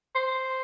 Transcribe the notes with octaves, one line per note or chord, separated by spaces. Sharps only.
C5